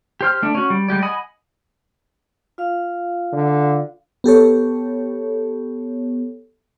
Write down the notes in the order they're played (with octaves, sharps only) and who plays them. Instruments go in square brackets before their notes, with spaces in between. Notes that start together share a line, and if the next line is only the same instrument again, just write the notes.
[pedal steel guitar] G4 C5 F6
A3 D4
C#4 F#4
G3
G3 G#3 G4 D5
D#5 F#5 G#5 B5 D#6
[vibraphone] F4 F5
[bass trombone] D3
[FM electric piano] B3 G4 A4 C#5